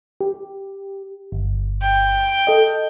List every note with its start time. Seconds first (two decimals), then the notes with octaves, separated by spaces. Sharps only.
0.21 G4
1.32 G1
1.81 G5
2.47 A4 D#5